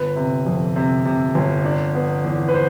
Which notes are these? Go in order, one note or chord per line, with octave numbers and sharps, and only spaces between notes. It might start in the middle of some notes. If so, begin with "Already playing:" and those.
Already playing: G1 B4
C3
F2
C3
C3
G1
D4
B3
E2
B4
C5